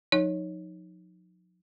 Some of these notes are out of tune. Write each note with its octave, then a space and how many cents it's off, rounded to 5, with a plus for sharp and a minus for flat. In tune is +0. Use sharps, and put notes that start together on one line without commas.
F3 +45 D#4 +0 C#5 +0